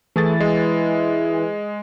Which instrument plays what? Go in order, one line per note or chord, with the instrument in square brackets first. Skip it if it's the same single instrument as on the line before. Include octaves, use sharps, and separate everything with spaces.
[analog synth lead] E3 [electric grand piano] A3 G#4 A6
[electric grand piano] G#3